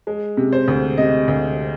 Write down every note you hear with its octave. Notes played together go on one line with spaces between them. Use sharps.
G#3
C3
C5
D2
C3 D#5
D2